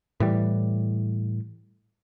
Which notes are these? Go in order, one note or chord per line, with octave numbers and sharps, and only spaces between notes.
A2 E3 G3